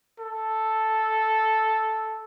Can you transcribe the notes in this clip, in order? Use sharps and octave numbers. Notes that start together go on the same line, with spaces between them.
A4